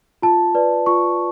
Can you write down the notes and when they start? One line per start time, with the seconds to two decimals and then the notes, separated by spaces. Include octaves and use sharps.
0.22 F4 A5
0.55 B4 D5
0.86 F4 C#6